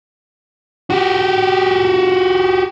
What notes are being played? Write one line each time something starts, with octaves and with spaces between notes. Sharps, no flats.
F#4 G4